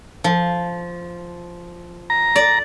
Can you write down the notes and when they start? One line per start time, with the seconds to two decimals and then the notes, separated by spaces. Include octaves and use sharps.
0.24 F3
2.10 A#5
2.36 D5